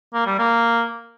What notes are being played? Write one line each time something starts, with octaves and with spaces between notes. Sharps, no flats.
A#3
G3
A#3